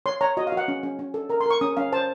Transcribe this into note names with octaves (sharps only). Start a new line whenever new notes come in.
C#5 C6
C#5 A#5
F#4 D#5
F5
F#4
F#5
C#4
C#4
C#4
A4
A#4 A#5
C6
A#4 C#6
C#4 D#6
C#4 F5
C5 A5